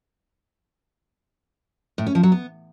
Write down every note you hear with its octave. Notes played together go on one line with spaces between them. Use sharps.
A2
C#4
F3
F#3
B3